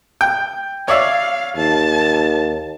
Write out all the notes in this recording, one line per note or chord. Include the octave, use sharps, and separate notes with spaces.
G5
C#5 D5 E5 F5
D#2 A5